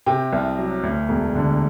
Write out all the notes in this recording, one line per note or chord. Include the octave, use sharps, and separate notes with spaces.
C3 G5
C2
F#3
D2
E1
D3